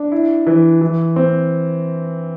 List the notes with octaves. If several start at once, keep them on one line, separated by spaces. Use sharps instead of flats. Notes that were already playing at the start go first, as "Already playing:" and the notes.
Already playing: D4
E4
E3
E3
C4